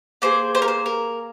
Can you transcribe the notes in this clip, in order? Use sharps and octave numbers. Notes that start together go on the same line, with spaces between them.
A#3 G#4 C5
C5
A#4
C5
A#4